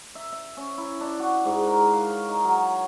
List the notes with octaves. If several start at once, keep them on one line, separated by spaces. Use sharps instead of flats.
E5
E5
C#4
E4
D4
F#4
G#2
A#4
F5
C#5
D#4
F#3